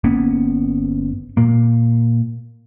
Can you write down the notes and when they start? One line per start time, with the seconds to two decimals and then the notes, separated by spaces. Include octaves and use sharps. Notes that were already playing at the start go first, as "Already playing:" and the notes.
0.04 G1 A#3 B3 C#4
1.37 A#2 A#3